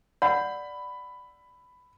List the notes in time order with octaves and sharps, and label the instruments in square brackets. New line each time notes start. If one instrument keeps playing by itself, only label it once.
[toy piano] D5 F#5 [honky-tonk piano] B5